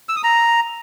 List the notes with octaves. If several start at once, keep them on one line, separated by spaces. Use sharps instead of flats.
E6
D#6
A#5